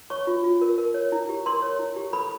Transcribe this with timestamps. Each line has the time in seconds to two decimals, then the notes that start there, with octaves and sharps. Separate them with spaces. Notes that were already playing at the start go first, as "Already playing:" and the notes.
0.10 C#5 C#6
0.27 F4
0.44 F4
0.61 A#4
0.78 A#4
0.94 C#5
1.12 E4
1.29 G4
1.46 A#4 C6
1.62 C#5
1.79 E4
1.96 G4
2.13 A4 B5